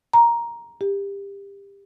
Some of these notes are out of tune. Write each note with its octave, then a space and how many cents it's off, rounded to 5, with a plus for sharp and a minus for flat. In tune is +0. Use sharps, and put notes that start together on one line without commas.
A#5 +10
G4 +25